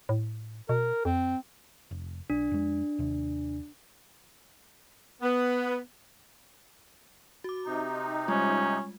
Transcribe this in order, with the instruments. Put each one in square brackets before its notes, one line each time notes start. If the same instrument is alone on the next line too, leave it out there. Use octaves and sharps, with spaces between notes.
[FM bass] A2
[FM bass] B2 [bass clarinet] A#4
[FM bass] F2 [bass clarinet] C4
[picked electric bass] F1
[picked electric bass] B1 [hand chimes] D4
[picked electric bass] F2 G#3
D#2 C3
[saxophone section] B3
[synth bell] F#4 D6
[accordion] C3 D#4
[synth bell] G3 G#3 F4 [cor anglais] C#4